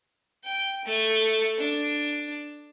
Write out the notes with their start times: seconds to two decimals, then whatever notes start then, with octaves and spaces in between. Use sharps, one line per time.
0.44 G5
0.85 A3
1.58 D4